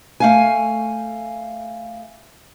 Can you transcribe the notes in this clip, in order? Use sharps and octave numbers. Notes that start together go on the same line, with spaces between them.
A3 F5 G#5